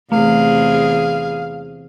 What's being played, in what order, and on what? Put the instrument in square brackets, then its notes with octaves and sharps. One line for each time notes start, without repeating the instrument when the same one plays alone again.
[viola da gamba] E2 C3 G#4 [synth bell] A3 [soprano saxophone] F5